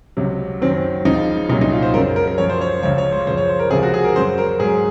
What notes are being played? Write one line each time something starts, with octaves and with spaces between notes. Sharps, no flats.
C#2 C3 F#3
F#2 D#3 F#3 C4
C#2 C#3 F3 D#4
C2 A#2 F#3 D#4
D#4
F4
C5
F#2 C#3 F#3 A#4
A#4
A#4
F#2 F3 C#5
C5
C#5
C5
C#2 C#3 F3 C#5
C#5
C5
F#2 C#3 F3 C5
C#5
C5
A#4
C#2 C3 F3 G#4
F#4
G#4
A#4
F#2 C#3 F#3 C5
A#4
G#2 F#3 G#4